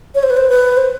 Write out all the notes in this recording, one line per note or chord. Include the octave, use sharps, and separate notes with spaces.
C#5
C5
B4
C5
B4
C5